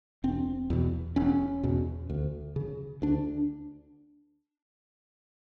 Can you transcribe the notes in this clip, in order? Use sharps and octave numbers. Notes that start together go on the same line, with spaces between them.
E1 C4
E2 B2
E1 C#4
E2 B2
D2
C#3
D2 D4